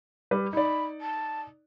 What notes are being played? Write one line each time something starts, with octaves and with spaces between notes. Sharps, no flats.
G3 B4
D#4 D5 B5
A5